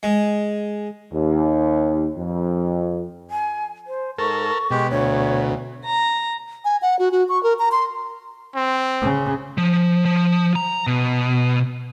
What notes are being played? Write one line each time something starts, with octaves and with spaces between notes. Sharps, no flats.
G#3
D#2
F2
G#5
C5
G#2 A4 A#4 C#6
B2 G#3 G4
D2 C#5
A#5
G#5
F#5
F#4
F#4
C#6
A#4
A#5
C6
C4
C#3
F3
F3
A#5
B2